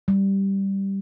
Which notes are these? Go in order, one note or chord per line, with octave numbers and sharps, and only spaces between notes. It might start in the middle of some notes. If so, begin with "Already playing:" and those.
G3